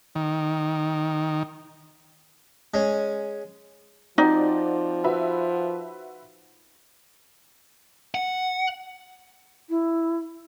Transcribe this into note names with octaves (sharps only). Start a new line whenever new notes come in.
D#3
G#3 C#4
F3 C4 D#4 F#4 D5
F#4 B4 E5
F#5
E4